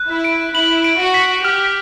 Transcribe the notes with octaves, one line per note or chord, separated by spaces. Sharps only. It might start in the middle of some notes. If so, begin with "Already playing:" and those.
Already playing: F#6
E4
D7
E4 F#7
D7
F#4
B6
G4 F6